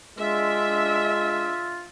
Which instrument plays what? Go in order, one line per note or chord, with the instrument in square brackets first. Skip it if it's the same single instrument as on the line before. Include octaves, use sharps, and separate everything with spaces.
[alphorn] G#3 [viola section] D4 E5 [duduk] F4